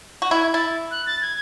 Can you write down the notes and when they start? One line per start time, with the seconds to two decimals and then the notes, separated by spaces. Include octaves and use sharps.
0.22 F#4
0.31 E4 G#6
0.54 E4 A6
0.91 F#6
1.06 A6
1.22 G#6